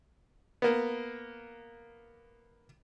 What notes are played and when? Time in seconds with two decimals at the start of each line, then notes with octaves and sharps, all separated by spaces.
0.62 A#3 B3